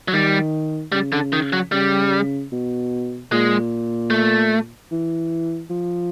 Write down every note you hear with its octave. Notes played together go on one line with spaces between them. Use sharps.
F#3
D#3 G3
C#3 G3
D3
D#3
F#3
C#3 G3
B2
A#2 G#3
A3
E3
F3